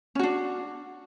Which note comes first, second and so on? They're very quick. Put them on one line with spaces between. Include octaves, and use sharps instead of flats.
C#4 F#4 D4